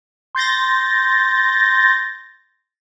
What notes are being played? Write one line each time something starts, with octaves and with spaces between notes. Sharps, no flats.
C6 G6 A6 A#6